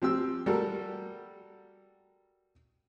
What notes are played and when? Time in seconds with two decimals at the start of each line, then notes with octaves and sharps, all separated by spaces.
0.02 F3 C4 G4 E6
0.46 G3 F#4 A4 A#4